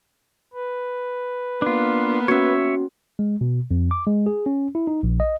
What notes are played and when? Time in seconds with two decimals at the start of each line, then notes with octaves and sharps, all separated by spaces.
0.54 B4
1.62 A#3 B3 D4 F4
2.28 C#4 F#4 C#5 E5
3.19 G#3
3.41 B2
3.71 F2
3.91 D6
4.07 G#3
4.26 G#4
4.46 C#4
4.75 E4
4.87 D#4
5.03 A#1
5.20 D#5